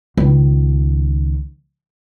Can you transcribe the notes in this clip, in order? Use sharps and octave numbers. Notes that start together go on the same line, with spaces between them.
C#2 D#3